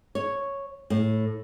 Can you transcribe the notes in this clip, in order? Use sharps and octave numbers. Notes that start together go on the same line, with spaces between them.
C#5
A2